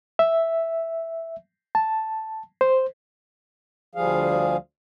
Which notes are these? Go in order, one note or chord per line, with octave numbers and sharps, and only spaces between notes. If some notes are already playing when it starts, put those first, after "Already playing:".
E5
A5
C5
D2 F3 G3 G#4 F5